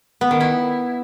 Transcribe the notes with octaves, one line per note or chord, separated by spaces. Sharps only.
B3
D#3
E4